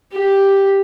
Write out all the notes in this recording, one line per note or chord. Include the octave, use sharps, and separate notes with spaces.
G4